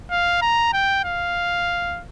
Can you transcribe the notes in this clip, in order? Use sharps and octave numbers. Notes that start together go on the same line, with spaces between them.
F5
A#5
G5
F5